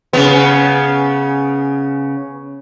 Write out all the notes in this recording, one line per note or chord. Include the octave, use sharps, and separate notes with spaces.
C#3 B3